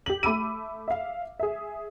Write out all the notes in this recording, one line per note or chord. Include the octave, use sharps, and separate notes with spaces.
G4 F#7
A3 B5 D6 E6 D#7
E5 F5
G#4 E5